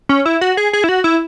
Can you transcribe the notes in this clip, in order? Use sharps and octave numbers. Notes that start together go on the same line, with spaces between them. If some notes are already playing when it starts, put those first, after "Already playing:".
C#4
E4
F#4
G#4
G#4
E4
F#4
E4